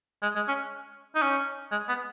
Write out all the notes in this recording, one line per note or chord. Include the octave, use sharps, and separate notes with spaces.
G#3
G#3
C#4
D#4
C#4
G#3
B3